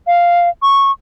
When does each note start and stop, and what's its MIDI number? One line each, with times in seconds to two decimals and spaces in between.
0.07 0.49 77
0.62 0.91 85